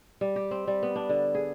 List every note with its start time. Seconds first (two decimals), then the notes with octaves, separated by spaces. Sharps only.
0.21 G3
0.36 G4
0.51 C4
0.67 G3
0.83 B3
0.96 D4
1.09 D3
1.35 G#4